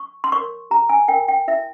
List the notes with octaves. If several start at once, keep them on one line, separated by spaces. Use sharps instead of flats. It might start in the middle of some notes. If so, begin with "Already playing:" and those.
Already playing: C#6
C6
A#4 C#5 C#6
G4 A#5
G#5
A#4 C#5 G5
G5
E4 E5